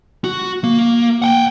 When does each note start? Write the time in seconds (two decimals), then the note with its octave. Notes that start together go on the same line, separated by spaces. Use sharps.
0.24 F#4
0.64 A#3
1.22 F#5 G5